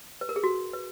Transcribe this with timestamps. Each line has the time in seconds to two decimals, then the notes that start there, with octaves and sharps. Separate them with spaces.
0.21 B4
0.29 A#4
0.36 G#4
0.44 F#4
0.73 B4